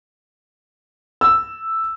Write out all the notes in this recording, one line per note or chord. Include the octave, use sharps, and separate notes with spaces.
E6